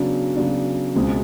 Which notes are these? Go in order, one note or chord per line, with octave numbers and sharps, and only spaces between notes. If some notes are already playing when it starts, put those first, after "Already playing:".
Already playing: C#3 F#3 B3 D4
C#3 F#3 B3 D4
C#2 B2 G#3 C4